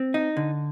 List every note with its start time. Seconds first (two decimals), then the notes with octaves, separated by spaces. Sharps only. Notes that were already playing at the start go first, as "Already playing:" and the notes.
Already playing: C4
0.14 D#4
0.37 D3